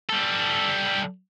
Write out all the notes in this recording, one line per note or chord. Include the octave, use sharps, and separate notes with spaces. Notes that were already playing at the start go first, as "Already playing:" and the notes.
G3 A4